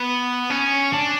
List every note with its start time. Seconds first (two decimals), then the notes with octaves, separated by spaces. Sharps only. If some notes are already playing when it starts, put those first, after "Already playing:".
Already playing: B3
0.50 C#4
0.93 D4